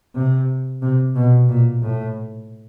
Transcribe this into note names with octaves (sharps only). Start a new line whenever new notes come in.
C3
C3
B2
A#2
A2